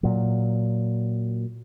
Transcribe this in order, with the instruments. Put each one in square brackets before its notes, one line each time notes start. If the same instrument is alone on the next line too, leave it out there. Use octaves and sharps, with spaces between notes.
[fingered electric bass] A#2 F#3